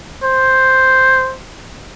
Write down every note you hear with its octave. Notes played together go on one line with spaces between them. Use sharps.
C5